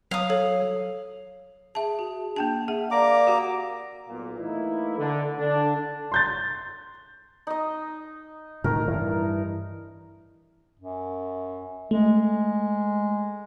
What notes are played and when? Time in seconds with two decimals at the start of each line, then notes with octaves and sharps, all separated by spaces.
0.11 F#3 F5 D#6
0.30 A4 C#5
1.75 G#4 E5 A5
1.99 F#4
2.36 A#3 D4 G5 A5
2.68 G#4 E5 F#5
2.91 A#3 D5 A#5 D6
3.27 F#4 G4 F#5
4.09 B1 A#2
4.40 E3 A3 A#3 D#4 E4
4.98 D3
5.38 D3 D4
6.12 C6 G6 A6
7.47 D#4 D#5
8.64 A2 D#3 A#4
8.88 G2 E3
10.79 F#2
11.91 G#3 A3